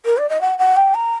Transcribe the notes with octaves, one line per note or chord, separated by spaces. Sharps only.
A#4
D5
D#5
F#5
F#5
G5
A#5